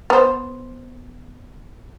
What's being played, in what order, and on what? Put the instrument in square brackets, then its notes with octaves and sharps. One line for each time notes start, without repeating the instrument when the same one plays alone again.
[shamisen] B3 C5